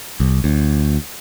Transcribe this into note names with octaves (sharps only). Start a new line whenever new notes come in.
C2
D2